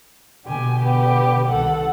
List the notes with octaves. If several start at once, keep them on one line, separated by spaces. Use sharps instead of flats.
B2 D3 G4 G#5
B3 G4
C2 D#3 A4 F#5